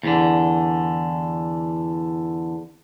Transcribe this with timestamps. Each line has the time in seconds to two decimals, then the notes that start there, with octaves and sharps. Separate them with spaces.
0.03 E2 D3